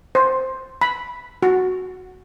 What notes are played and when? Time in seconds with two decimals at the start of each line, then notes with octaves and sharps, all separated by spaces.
0.15 C5
0.81 B5
1.43 F#4